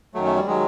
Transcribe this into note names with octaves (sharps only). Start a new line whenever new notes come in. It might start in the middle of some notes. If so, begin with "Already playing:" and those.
F#2 D#3 F#3 A3
A3
G3
D#3 F#3 G#3